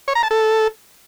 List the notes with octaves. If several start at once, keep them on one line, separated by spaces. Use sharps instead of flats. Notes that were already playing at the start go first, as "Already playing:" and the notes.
C#5
A#5
A5
A4